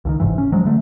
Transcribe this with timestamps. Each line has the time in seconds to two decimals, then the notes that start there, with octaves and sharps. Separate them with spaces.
0.05 C#2 D3 D#3
0.20 G1 G#2 C3 E3
0.38 C#4
0.52 F3 F#3 G#3
0.65 D3 A3